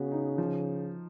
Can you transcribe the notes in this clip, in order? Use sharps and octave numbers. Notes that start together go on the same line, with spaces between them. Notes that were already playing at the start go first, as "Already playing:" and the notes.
Already playing: C#3 B3 F#4
D#4
F3